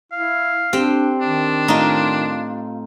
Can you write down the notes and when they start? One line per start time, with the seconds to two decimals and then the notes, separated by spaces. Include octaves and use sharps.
0.12 E4 F5
0.73 C4 D4 G4
1.21 D#3 D4
1.68 A2 D#4 F4